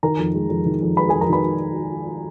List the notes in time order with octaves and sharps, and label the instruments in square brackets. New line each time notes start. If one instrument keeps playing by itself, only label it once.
[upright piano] D#3 A#4 A#5
F2
G#3
F2
D#3
F2
G#3 B4 B5
F2 G#4 G#5
A#4 A#5
D#3 B4 B5